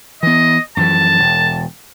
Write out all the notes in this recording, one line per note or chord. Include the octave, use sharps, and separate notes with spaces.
E3 B3 D#5
F#2 E3 F3 A5
E1